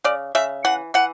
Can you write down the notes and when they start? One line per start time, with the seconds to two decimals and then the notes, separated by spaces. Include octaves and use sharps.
0.04 C#3 D5
0.35 C#3 E5
0.65 E3 F#5
0.94 E3 F#5